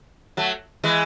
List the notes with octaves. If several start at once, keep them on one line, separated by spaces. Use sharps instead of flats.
F#3 A3
E3 G#3